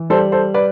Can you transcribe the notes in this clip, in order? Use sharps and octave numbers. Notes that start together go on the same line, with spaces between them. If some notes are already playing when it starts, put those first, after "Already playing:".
Already playing: E3
G3 A4 C5
A4 C5
B4 D5